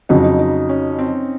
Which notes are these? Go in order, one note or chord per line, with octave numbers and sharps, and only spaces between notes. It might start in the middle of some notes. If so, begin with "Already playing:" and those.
F2 C#3 F#3 D#4
D#4
D#4
C#4
C4